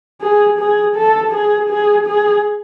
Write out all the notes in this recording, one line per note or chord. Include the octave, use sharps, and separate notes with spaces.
G#4
G#4
A4
G#4
G#4
G#4